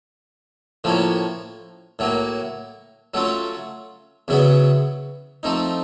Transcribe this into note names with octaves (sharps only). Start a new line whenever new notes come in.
A2 F3 A#3 C#4
A2 F#3 A#3
F#3 A3 C#4 F4
E2 C#3 F#3 B3
F3 A3 C4 D#4